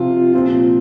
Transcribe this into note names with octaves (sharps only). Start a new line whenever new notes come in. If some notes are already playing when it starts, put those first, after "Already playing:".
Already playing: C3 F3 C4 F4
A#2 F3 C4 F4